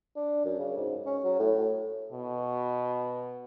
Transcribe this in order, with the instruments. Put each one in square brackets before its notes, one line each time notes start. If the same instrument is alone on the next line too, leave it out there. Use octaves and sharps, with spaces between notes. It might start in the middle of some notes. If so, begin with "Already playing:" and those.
[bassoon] D4
F#2
C#3
G#2
C#4
F#3
A2
[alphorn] B2